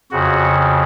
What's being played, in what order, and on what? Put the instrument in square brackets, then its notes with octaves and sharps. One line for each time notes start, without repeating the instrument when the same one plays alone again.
[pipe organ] F2 C#3 F#4